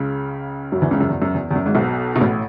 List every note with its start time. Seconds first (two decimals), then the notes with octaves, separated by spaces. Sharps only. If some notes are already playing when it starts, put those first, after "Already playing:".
Already playing: C#2 C#3
0.72 F#2 F#3
0.81 E2 E3
0.91 C#2 C#3
1.00 F#2
1.09 E2
1.22 F#2
1.34 E2
1.51 E2
1.55 F#2
1.66 G#1 G#2
1.75 B1 B2
2.16 B2
2.21 A1 A2